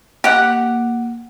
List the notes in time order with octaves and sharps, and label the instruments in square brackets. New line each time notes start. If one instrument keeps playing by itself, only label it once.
[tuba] A#3 [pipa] G4 F#5